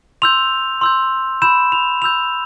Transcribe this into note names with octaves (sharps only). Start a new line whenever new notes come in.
C6 E6 G6 F7
C6 E6 G6
B5 E6 G6 E7
F7
B5 E6 G6 F7